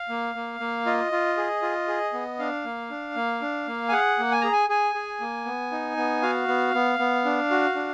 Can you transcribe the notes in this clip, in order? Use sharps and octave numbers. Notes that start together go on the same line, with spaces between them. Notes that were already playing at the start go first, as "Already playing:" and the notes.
Already playing: F5
A#3
A#3
A#3
F4 D#5
F4
G#4
F4
G#4
B3
D4 F5
A#3
D4
A#3
D4
A#3
G#5
G#4 F#5
A#3
G#5
G#4 A#5
G#5
G#4 G#5
G#4
A#3
B3
D#4
B3
F#4 F5
B3
B3
B3
D4
F#4
D4